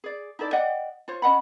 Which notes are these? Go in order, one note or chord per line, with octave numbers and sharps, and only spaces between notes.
G#4 D5
D#4 E4 A4 D5
D5 D#5 F#5 G5
F4 C5 C#5
C#4 D#5 F#5 B5